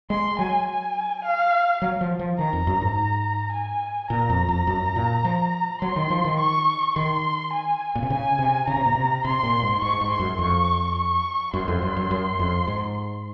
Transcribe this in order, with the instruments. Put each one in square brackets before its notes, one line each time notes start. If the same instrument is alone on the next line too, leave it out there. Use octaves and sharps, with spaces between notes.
[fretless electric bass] G#3 [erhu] C6
[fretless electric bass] F#3 [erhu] G#5
[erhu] G#5
F5
[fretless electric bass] F#3
F3
F3
[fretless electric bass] D#3 [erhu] A#5
[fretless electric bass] F2
F#2
G#2
[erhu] A#5
G#5
[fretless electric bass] A#2 [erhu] A#5
[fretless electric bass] F2
F2
F#2
A#2
F3
[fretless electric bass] F#3 [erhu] C6
[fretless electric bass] D#3
F3
D#3
[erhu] C#6
[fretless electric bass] D#3 [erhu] C6
[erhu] G#5
[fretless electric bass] A#2
C3
[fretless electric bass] C#3 [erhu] G#5
[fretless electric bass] C3
[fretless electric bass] C#3 [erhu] A#5
[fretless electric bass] C3
A#2
C3
[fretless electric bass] C3 [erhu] C6
[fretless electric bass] A#2
G#2
[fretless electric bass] G#2 [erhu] C#6
[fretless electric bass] G#2
[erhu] C6
[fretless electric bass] F#2
[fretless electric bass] F2 [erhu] C#6
[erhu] C#6
[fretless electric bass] F#2 [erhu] C6
[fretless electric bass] F2
F#2
F#2
F#2
F2
G#2